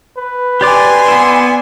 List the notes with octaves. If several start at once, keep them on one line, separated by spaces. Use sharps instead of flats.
B4
G4 D5 G#5 C6 D6
B3 E4 D5